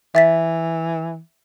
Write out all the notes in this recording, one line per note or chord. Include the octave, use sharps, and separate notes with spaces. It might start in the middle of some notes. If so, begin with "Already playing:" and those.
E3 E5 A6 B6